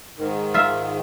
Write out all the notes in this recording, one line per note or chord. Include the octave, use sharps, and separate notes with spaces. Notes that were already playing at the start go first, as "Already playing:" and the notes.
G#2 D#3
F4 E5